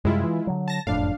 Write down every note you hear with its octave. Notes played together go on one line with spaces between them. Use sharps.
F#2 C3 G3 G#3 E4 F4
E3
D3 F#3
A5 A#6
F#1 F2 A2 D4 F5